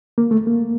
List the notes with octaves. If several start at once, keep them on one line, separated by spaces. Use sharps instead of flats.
A#3
A3
A#3